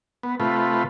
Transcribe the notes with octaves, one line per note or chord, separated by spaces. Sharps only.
B3
C3 A3 F4 B4